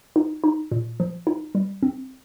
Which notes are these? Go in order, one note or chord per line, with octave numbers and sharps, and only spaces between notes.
D#4
D#4
A#2
F3
D#4
G3
C4